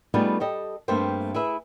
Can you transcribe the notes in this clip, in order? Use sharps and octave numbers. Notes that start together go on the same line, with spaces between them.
G3 A3 B3 D#4 F4 G#4
G4 A4 D#5
G2 A3 A#3 C4 C5 G5
E4 G#4 B4 E5